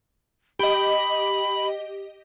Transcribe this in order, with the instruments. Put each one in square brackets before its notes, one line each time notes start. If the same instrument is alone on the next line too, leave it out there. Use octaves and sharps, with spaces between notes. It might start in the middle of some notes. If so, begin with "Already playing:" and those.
[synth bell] G4 D#5 [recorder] B5